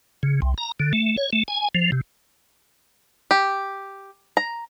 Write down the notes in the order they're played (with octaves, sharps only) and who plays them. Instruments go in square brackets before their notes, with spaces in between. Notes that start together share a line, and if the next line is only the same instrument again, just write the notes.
[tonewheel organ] C#3
C2
A#5
D3
A3
C#5
A3
G#5
F3
C3
[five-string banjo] G4
A#5